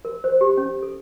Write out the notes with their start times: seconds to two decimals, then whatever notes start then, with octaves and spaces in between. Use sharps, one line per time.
0.05 A#4
0.24 C5
0.41 G4
0.57 C#4
0.83 A4